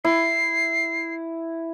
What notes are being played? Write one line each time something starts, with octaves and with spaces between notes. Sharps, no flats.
E4 C7